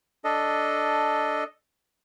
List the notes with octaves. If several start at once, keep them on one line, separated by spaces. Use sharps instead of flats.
D4 A4 D#5